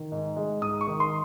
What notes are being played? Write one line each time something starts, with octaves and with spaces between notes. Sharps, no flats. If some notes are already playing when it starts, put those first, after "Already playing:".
Already playing: D#3
G#2
G#3
G#2 D#6
C#6
D#3
C6